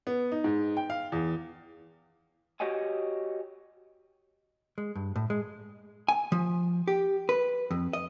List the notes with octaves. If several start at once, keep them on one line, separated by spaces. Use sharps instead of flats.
B3
D#4
G#2
G5
F5
E2
F#4 G4 C#5 D#5 F#5 G#5
G#3
G2
A2
G#3
G#5
F3
G4
B4
F2
D#5